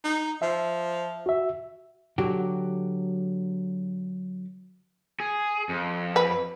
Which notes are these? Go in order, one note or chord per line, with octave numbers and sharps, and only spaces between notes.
D#4
F3 E5
F#4 E5
D3 F#3 F#4 G4
G#4
F2
B4